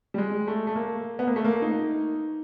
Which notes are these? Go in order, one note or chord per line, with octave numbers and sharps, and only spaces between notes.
G3
G#3
A3
A3
A#3
B3
A#3
A3
A#3
D#4